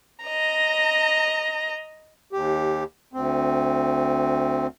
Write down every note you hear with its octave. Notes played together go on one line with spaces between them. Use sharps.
D#5 A#5
D#2 G4
D2 C4